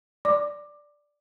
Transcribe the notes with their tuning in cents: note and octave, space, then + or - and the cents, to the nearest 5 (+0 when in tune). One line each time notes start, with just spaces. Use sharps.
D5 +0 D6 +15